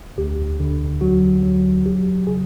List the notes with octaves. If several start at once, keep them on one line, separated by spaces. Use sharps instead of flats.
D2 G4
D3
F#3 F#4
F#3
F#3 G4
C#3 G#4